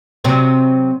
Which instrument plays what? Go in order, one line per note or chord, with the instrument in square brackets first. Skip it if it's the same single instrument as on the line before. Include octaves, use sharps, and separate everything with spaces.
[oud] C3 F#3 C4